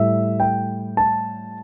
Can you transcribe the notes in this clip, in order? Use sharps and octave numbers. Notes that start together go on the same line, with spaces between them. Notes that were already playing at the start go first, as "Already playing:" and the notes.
Already playing: A2 G3 E5
G5
A5